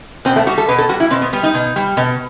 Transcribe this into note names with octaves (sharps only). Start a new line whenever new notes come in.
B2 C4
A3
G3 F#4
A4
B2 B4
A4
G3 F#4
E4
B2 C4
B3
G3 B3
D#4
B2
G3
B2